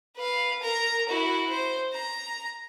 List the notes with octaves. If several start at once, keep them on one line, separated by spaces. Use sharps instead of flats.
B4 F5
A#4 A#5
E4 F#4
C5
A#5